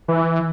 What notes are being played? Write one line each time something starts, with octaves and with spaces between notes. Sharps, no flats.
E3